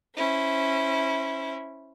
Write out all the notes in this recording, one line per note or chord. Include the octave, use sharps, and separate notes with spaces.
C#4 E4 C5